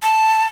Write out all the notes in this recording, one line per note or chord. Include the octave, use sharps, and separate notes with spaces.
A5